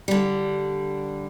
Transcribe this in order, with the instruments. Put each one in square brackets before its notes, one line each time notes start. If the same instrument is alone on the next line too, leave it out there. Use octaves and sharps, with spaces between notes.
[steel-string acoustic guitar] D3 G3